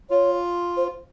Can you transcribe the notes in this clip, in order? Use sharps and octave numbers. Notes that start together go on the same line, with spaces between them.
F4 C#5
C5